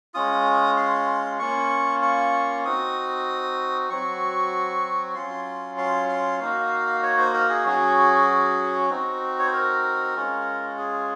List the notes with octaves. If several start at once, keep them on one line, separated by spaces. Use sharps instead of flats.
G#3 C#4 F4 D#6
C6
A#3 C#4 F4 C#6
C#6
C4 D#4 F#4 D#6
F#3 C4 F#4 C#6
F#3 C#4 F4 C6
C6
C6
A#3 D#4 F#4 F5
C#5
C5
A#4
G#4
F#3 C#4 F#4
C4 D#4 F#4
C#5
C5
A#4
G#3 C#4 F4
G#4